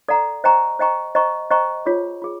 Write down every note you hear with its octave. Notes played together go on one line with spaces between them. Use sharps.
A4 D5 F#5 A#5
C5 D#5 G5 A#5 C#6
C5 D#5 G5 A#5 C#6
C5 D#5 G5 A#5 C#6
C5 D#5 G5 A#5 C#6
F4 G#4 C#5
F4 G#4